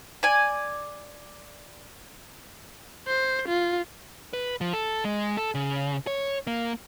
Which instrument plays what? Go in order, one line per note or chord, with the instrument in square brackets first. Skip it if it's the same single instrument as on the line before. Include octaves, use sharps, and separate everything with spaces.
[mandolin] D5 G#5
[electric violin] C5
F4
[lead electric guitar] B4
F3
A4
G#3
A4
C#3
C#5
A#3